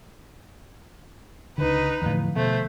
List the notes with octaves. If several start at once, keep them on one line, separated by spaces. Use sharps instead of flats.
C#2 D3 D#4 B4
E2 A2 D3 F3
B2 A3 C5